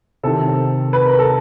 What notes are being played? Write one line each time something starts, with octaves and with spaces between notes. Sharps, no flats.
C3 D#3 A4
B4
A#4
A4